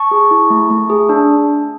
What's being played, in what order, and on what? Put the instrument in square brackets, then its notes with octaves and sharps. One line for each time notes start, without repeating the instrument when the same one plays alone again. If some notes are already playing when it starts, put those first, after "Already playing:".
Already playing: [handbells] A5 C#6
G#4
E4
A3
A3
G#4
D4